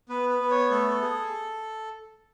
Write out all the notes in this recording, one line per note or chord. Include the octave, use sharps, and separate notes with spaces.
B3 B4
B4
B3
C#5
A3 A4
G#4